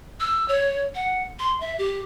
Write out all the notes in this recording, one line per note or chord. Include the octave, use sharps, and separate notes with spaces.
E6
C#5
F#5
C6
E5
G4